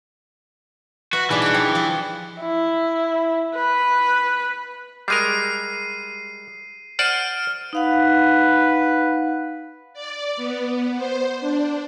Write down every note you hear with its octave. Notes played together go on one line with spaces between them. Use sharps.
F#4 B4 E5
B2 E3 G3 D4 D#4 G#4 G#5
C#5 G5 F#6
F3 G3 G5 C#7
F3 E4 G#4
E4
B4
G3 G#3 A#4 C7 D#7
C5 D5 F#5 F6 D7 D#7
D#4 B4 F5 F#5
D5
B3
C5
D4